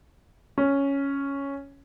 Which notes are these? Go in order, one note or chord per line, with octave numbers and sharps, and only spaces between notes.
C#4